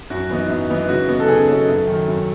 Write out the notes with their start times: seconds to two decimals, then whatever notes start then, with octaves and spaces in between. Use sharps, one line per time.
0.10 F#2 F#4
0.30 E3 B3 D#4
0.49 F#2
0.69 E3 B3 D#4
0.89 C#3 F#4
1.09 F#3 B3 D#4
1.20 A4
1.28 C#3 G#4
1.48 F#3 B3 D#4 A4
1.68 F#2
1.87 D#3 F#3
2.08 F#2